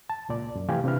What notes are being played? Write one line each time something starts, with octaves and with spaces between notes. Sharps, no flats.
A5
C#2 A#2 D5
F#2
C3 E3 A3 G4 F5 G#5
C3 D4 E4 B4 F6